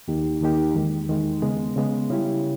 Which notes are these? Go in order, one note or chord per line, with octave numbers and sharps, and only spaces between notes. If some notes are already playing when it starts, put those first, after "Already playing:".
D#2 D#3 A#3 D#4 G4
D#2 D#3 A#3 D#4 G4
E2 D#3 G#3
E2 D#3 G#3
C#3 G#3 B3
C#3 G#3 B3
C#3 G3 C#4 E4 G4